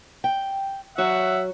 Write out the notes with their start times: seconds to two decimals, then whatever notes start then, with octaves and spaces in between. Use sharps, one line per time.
0.24 G5
0.98 F#3 F#4 C#5 E5 F#5